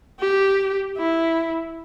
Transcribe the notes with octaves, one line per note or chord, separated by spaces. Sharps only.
G4
E4